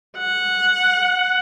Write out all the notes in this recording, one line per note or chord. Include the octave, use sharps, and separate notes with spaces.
F#5